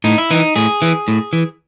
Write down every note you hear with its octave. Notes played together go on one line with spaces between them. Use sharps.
A2 D#4
E4
E3 D#4
A2 G#4
E3
A2
E3